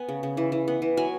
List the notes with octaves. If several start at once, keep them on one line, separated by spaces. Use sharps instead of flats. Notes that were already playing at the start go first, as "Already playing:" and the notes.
Already playing: B3 G#5
C#3
C#3
E3
E3
B3
E3
F#3 G#5